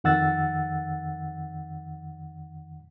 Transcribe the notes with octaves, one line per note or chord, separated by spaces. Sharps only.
F2 D#3 F#5 E6 A6